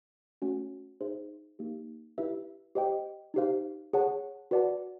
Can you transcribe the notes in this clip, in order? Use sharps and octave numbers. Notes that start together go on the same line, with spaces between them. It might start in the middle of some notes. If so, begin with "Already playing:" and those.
A3 C#4 F#4
D#4 G#4 C5 E5
A#3 D#4 G4
E4 G4 B4 E5
G4 C5 D#5 G5
D#4 G4 C5 F5
G#4 C#5 F#5 A5
F#4 B4 D5 F#5 A5